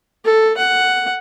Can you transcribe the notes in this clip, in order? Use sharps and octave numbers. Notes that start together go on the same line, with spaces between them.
A4
F#5